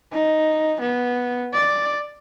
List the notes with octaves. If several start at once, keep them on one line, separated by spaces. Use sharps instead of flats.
D#4
B3
D5